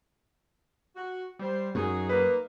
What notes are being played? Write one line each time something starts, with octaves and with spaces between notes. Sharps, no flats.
F#4
G3 C5
F#2 F#3 D#4 G#4
A#3 D#4 B4